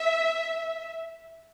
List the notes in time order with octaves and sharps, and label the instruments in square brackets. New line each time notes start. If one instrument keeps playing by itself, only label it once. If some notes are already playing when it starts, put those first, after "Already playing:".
Already playing: [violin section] E5